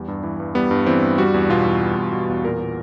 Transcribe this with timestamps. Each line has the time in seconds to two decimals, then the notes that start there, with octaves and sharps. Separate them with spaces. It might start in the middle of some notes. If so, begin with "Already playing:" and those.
Already playing: E2 G3
0.08 G2
0.23 E3
0.40 G2
0.55 G3 B3
0.71 G2
0.86 E3 C4
1.02 G2
1.18 G3 F#4
1.34 E2
1.50 B2 F4
1.66 E2
1.82 G3
1.97 E2
2.12 B2
2.29 E2
2.44 A#2 A#4
2.60 A#2